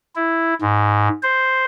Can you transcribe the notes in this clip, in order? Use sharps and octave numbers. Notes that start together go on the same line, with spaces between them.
E4
G#2
C5